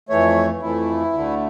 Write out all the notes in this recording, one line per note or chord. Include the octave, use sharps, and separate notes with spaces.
F2 E3 A3 C#5
F2 E3 A3 E4
D2 D3 A3